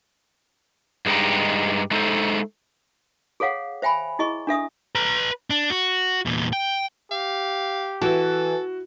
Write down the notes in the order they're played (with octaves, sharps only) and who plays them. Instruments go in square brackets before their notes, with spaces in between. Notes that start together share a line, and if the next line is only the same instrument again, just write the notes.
[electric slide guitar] G2 G#3 D#4 G4
G#3 A3 D#4 A4 B4 C5
[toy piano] G#4 A4 C#5 F5 F#5
C5 E5 G5 G#5 B5
E4 G#4 D#5 C#6
D4 A4 E5 D#6
[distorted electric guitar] B4 A#5
D4
F#4
E2 A#2
G5
[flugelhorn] G4 [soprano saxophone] F5
[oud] E3 [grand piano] F#4 [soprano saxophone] A4